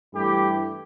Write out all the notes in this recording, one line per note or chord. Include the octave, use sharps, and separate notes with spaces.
G2 E3 A3 E4 G4